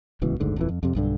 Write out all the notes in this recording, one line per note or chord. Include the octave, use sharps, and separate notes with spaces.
D1 C#2 B2 E3
F#1 D2 G#2 D3
D#1 F2 E3
F2
F2 C3
B1 G2 D3